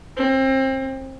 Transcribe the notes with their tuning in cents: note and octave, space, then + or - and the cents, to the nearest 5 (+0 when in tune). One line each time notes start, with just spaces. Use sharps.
C4 +30